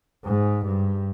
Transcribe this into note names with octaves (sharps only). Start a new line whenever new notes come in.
G#2
G2